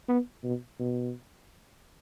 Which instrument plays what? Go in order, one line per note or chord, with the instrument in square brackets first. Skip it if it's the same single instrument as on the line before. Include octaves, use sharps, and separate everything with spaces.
[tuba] B3
B2
B2